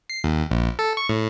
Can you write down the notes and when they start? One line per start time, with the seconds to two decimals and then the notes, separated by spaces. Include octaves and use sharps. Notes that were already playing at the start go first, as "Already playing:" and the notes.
0.10 C7
0.24 D#2
0.51 A#1
0.79 A4
0.97 C#6
1.09 A2